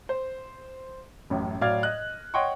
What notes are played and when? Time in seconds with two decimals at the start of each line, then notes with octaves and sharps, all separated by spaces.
0.09 C5
1.30 A1 F#2 A2
1.61 A2 F#3 D5 F5 F6 G#6
1.83 D#5 F#6
2.34 C#5 D#5 F#5 G5 C6 C#6